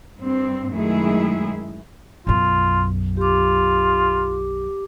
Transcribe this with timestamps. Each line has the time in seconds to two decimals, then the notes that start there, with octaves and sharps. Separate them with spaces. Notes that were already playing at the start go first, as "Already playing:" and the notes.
0.20 G2 C4
0.72 F#2 D#3 G#3 A3 E4 G#4
2.27 B1 F#2 F4
3.17 F4 G4 D6